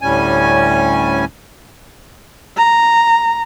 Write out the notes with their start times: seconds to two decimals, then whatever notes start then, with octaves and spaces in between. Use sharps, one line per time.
0.02 D2 A2 G3 C#4 G#5
2.57 A#5